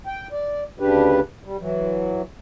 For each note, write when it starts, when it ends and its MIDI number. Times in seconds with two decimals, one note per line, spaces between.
0.07 0.27 79
0.32 0.64 74
0.80 1.20 38
0.80 1.20 49
0.80 1.20 62
0.80 1.20 67
0.80 1.20 71
1.45 1.57 55
1.60 2.22 52
1.60 2.22 54